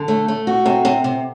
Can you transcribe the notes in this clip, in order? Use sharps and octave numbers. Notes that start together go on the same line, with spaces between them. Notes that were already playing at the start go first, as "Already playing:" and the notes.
Already playing: D3
A3
A3
F#4
C3
C3
C3